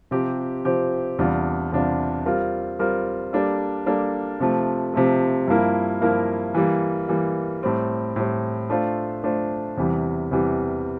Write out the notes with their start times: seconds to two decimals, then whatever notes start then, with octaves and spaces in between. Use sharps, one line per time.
0.11 C3 F3 C4 G4
0.65 C3 F3 C4 G4
1.19 E2 C3 G3 D4 F4
1.72 E2 C3 G3 D4 F4
2.26 G3 C4 F4 A#4
2.79 G3 C4 F4 A#4
3.33 G3 A#3 D4 A4
3.86 G3 A#3 D4 A4
4.40 C3 F3 A3
4.94 C3 F3 A3
5.48 G2 F3 A#3 E4 A#4
6.02 G2 F3 A#3 E4 A#4
6.54 E3 G3 A#3
7.08 E3 G3 A#3
7.63 A2 G3 C4
8.16 A2 G3 C4
8.70 A3 D4 F4 C5
9.24 A3 D4 F4 C5
9.77 E2 C3 E3 G3
10.31 E2 C3 E3 G3